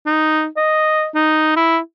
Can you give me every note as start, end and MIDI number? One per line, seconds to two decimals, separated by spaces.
0.06 0.46 63
0.57 1.07 75
1.15 1.54 63
1.56 1.78 64